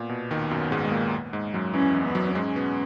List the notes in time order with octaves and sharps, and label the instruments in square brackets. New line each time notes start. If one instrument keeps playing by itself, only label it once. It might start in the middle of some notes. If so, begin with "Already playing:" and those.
Already playing: [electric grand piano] A#2 [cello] B3
[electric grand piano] B2
D#2 D#3
F#2 F#3
G#2 G#3
G#3
A#2 A#3
G#2 G#3
F#2 F#3
[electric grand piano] E2 E3 [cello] C#4
[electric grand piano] E2 E3
[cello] B3
[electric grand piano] F#2 F#3
[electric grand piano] G#2 G#3 [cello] C#4
[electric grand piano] B2 B3